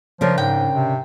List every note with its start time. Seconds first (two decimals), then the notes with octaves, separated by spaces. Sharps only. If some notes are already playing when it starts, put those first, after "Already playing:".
0.21 C#3 F3 D4 A#4
0.38 G#2 G5
0.73 C3